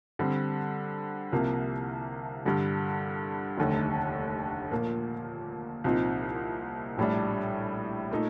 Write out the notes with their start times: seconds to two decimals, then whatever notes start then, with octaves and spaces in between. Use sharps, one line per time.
0.19 D3 G3 C4
1.32 C2 C3 F3 A#3
2.45 G2 D3 G3
3.58 F1 D#2 D3 A3
4.71 A#2 F3 A#3
5.84 C2 A#2 F3 C4 D#4
6.98 A#1 A2 G3 D4
8.11 A#2 A3 D#4